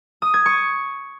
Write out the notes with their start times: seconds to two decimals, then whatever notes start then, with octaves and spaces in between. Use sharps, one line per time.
0.22 D#6
0.34 G#6
0.46 C#6